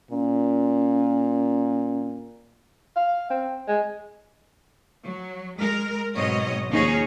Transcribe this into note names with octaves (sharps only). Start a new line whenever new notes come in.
A#2 C#4
F5
C4
G#3
F#3
G#3 A#4
G#2 B2 F#3 C4 C#5 D#5
D#2 F3 C#4 D#4 G#4 C#5